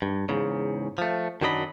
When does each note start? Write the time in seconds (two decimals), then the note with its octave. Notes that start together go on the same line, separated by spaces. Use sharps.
0.02 G2
0.29 E2 G#2 C#3
0.98 F3 A3
1.41 F#2 D#3 F#3 D4 D#5 B5